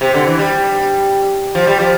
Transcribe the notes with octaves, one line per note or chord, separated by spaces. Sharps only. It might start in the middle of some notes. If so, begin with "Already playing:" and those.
C3
D3
E3
G3
F3
G3
F3